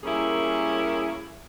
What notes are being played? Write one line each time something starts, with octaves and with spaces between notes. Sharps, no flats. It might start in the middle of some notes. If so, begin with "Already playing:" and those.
G3 A#3 C#4 E4 G#4 A#4